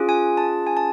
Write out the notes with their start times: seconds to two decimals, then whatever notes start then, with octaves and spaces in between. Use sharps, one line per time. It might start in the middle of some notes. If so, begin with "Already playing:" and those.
Already playing: C#4 F4 G#4
0.09 G#5
0.37 A5
0.67 G#5
0.77 A5